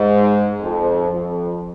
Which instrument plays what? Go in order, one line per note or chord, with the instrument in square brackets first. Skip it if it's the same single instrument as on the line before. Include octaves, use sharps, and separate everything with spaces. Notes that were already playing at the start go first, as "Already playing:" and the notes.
Already playing: [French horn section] G#2
F2
F2